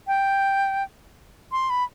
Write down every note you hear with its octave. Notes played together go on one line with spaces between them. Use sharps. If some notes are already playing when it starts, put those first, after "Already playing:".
G5
C6
B5